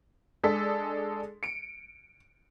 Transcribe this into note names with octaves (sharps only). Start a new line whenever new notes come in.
G#3 D4 G#4 A4 B6
C#7 D7